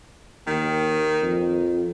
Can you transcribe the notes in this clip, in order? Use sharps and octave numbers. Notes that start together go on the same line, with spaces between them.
D#2 D#3
F2